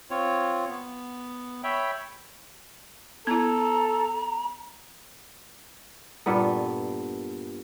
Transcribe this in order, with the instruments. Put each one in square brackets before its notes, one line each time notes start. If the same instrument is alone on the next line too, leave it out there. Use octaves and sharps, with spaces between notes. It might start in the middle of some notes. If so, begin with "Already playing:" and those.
[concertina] C4 F4 C#5
B3
C#5 E5 G5 B5
[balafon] B3 E4 [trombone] A4 [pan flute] A#5
[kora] G2 A#2 B3 A4